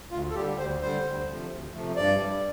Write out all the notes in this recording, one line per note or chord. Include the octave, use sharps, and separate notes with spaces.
D2 F4
A4
D3 G3 G4
D2 C5
D3 G3 C5
D2
C3 F3 A3
D2
C3 F3 A3
G2 D5
G3